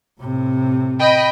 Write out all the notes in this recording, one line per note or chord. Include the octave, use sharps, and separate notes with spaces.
A2 C3
D#5 G5 B5